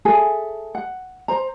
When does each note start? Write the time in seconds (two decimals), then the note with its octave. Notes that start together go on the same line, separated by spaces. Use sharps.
0.05 G#4 A4 E5 G#5
0.75 F#5
1.28 C5 A#5